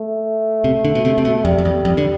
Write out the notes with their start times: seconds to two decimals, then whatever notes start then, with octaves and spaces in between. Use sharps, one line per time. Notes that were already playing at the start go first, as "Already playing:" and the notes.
Already playing: A3
0.64 C3
0.85 D3
0.95 B2
1.05 C3
1.18 C3
1.25 B2
1.45 F2 G3
1.58 F2
1.65 E2
1.85 F2
1.97 D3